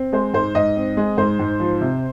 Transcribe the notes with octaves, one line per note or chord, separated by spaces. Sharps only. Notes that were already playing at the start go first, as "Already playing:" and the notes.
Already playing: C4
G#3 C5
G#2 C5
G#2 D#5
C4
G#3
G#2 C5
G#2
F3
C3